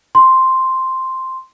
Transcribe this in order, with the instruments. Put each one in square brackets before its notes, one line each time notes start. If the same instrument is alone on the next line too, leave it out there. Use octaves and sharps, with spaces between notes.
[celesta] C6